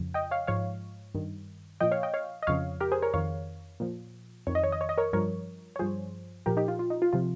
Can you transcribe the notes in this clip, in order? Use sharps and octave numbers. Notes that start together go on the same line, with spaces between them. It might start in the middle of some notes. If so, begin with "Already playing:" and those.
Already playing: F2 C#3 F3
D#5 G5
C#5 F5
G#2 F3 C#5 F5
G2 D#3
A#2 F3 D#5 G5
C#5 F5
D#5 G5
C#5 F5
D#5
F2 C#3 F3 C#5 F5
G4 A#4
G#4 C5
A#4 C#5
F2 D#3 C#5 F5
A#2 F3
F2 D#3 C#5
D#5
C#5
D#5
C#5
D#5
A#4 C#5
G2 F3 A#4 C#5
C#5
G2 F3 G#4 C5
A#2 F3 G4 A#4
D#4 G4
F4
F4
D#4
F4
C3 F3 F4